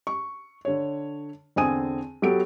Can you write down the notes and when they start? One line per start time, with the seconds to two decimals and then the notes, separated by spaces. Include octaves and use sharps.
0.07 C#6
0.65 D3 C#5
1.56 E2 D3 C4 G#5 D#6 D#7
2.22 F#3 B3 G4 A4 D7